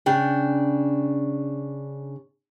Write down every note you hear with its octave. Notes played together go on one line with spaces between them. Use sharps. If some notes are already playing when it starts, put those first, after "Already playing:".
C#3 D4 G5